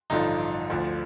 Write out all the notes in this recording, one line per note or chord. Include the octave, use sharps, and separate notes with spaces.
A1 G2 D3 F3 D#4
D2 D3 F3